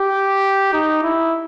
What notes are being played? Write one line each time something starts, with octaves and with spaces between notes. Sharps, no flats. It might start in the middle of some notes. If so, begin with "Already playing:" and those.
Already playing: G4
D#4
E4